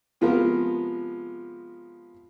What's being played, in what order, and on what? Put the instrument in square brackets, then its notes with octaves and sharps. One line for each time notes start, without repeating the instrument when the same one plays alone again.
[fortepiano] C3 F3 G#3 B3 A#4